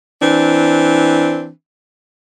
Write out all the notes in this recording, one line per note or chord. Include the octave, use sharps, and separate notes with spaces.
E3 C4 D4